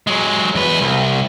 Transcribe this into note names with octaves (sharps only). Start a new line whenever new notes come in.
F#3 G#3
E2 B4
C2